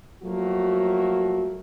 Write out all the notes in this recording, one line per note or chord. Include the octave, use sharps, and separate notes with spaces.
F3 F#3 A3 A#3 F#4